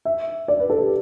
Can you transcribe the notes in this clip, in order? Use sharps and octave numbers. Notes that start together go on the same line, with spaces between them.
E5
D5
B4
A4
G4